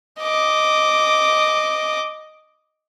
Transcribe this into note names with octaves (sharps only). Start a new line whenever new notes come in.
D#5 D6